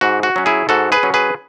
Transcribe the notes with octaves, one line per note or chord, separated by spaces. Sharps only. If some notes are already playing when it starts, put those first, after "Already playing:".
G#2 F#4
F#4
F#3 C#4
E4 G#4
G#2 F#4 A4
G#4 B4
F#3 C#4
G#4 B4